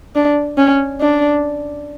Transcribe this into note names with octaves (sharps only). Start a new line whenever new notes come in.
D4
C#4
D4